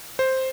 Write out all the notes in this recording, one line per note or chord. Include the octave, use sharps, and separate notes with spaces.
C5